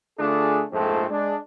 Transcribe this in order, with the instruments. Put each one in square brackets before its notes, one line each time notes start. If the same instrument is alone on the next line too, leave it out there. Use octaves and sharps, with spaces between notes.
[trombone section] D3 A3 D4 F4 G#4
A#1 F2 G#2 A3 C4 A4
G#3 D4